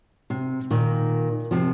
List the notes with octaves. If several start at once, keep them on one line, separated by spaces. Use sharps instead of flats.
C3
A#2 D#3
C3 F3